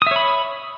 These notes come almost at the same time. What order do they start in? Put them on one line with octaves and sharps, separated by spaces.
D#6 E5 C#5 B5